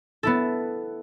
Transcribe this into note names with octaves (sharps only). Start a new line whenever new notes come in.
B3 E4 A4